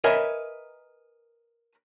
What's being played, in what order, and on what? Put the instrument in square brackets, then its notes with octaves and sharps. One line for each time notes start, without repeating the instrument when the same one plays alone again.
[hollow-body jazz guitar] A#4 B4 C#5 D#5 E5 G#5